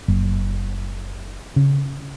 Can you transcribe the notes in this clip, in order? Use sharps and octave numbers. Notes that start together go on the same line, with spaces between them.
F#1
C#3